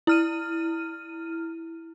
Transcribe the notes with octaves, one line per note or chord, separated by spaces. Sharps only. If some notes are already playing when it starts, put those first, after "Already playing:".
E4 F6 D#7